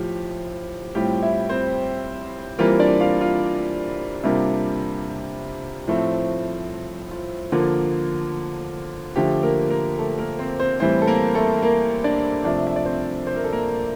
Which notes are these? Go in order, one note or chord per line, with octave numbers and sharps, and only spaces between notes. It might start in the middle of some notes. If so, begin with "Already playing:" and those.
Already playing: A2 F3 G4
A2 G3 C4 F4 G4 G5
E4 E5
C4 C5
E3 G3 A#3 C4 F4 A#4
D4 D5
F4 F5
F4 F5
C3 G3 A#3 D4 F4
A2 F3 A3 C4
F4
D3 F3 A#3 F4
D3 F3 A3 G4
A#3 A#4
A#3 A#4
A3 A4
A#3 A#4
C4 C5
C4 C5
A2 E3 G3 C4 C5
A4
A#3 A#4
A3 A4
A#3 A#4
D4 D5
C3 F3 A3 D4 D5
E5
D5
C4 C5
C5
A#4
A4
A#3 A#4